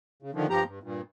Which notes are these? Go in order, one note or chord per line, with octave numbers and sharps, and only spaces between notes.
C#3
D3 D#3 F3
G2 F3 G4 A#5
G2
G2 A#2